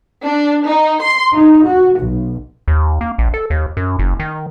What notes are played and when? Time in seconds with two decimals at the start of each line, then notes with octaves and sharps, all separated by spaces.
0.23 D4
0.64 D#4
1.02 C6
1.34 D#4
1.66 F#4
1.99 B1
2.68 D#2
3.01 A#3
3.18 A#1
3.34 A4
3.50 D#2
3.77 F#2
3.99 F#1
4.19 D#3